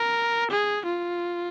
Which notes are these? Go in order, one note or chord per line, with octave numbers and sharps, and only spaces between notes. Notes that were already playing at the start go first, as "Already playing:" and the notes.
Already playing: A#4
G#4
F4